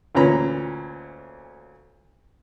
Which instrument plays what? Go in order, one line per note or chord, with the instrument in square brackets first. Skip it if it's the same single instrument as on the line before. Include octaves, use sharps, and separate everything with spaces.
[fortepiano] D2 A#2 E3 C#4 A#5 B5